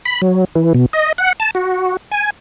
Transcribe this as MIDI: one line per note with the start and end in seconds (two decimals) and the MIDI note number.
0.05 0.22 83
0.22 0.45 54
0.55 0.73 52
0.74 0.86 47
0.93 1.12 75
1.18 1.33 78
1.40 1.51 81
1.55 1.97 66
2.11 2.30 80